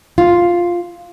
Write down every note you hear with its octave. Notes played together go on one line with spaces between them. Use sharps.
F4